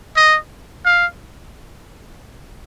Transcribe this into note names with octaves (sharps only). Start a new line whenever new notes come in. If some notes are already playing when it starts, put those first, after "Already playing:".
D#5
F5